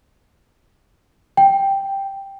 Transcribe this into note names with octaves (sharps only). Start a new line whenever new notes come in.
G5